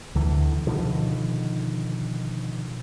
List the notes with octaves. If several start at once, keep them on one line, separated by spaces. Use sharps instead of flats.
D2 D3 E3
B2 D3 D#3 F3